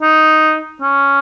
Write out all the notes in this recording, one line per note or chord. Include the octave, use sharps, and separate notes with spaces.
D#4
C#4